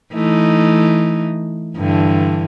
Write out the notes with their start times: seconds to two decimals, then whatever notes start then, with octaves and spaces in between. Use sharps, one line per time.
0.13 E3 A3 D#4
1.77 G2 D3 E3